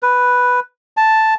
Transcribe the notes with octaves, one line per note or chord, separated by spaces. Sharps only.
B4
A5